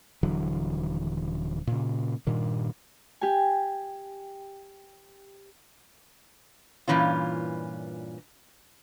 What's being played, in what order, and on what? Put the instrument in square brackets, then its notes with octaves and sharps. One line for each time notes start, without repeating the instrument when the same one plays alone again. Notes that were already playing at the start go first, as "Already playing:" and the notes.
[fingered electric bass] D#1 D3 E3 F#3
A#2 C#3
G2 A#2 D#3
[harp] G4 G#5
[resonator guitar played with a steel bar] G2 A#2 E3 C#4 F4